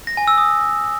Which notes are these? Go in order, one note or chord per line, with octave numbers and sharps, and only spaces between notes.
A#6
G#5
E6
D#6